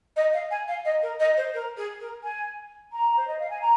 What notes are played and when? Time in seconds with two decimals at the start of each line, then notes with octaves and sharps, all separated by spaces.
0.16 D#5
0.33 F5
0.51 G#5
0.68 F5
0.85 D#5
1.02 A#4
1.20 D#5
1.37 C5
1.54 A#4
1.77 G#4
2.00 A#4
2.23 G#5
2.92 A#5
3.17 C5
3.27 D#5
3.39 F5
3.50 G#5
3.61 A#5